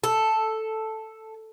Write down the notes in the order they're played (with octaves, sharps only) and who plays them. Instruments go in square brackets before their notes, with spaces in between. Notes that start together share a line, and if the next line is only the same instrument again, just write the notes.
[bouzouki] A4